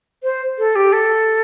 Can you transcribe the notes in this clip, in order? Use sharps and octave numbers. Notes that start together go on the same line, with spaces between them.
C5
A4
G4
A4